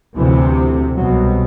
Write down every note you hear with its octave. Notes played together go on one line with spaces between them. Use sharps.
D2 C3 E3
C2 B2 F#3